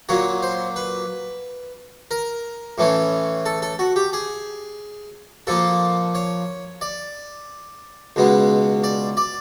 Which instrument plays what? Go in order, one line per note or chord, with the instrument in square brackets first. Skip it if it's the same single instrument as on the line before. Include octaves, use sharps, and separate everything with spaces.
[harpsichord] A#2 F#3 A#3 C#5
C5
B4
A#4
A2 E3 A3 C#4
A4
A4
F#4
G4
G#4
A#2 F3 A#3 A4
C#5
D5
C#2 B2 G#3 B3
D5
D5